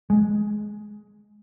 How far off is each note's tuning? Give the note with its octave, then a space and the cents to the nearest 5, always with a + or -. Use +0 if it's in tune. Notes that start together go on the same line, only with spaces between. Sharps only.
G#3 +15